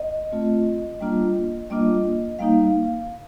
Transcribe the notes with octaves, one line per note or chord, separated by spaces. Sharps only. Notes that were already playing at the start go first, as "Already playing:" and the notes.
Already playing: D#5
A3 C4 F4
G3 A#3 D4 F4
G3 A#3 D4 F4 D#5
G3 A#3 D#4 F5